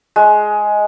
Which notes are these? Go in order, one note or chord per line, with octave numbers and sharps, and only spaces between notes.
G#3